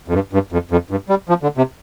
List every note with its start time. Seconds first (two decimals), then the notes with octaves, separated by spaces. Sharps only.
0.08 F2
0.14 G2
0.33 G2
0.52 F2
0.71 F2
0.90 G2
1.09 G3
1.29 F3
1.43 D3
1.57 C3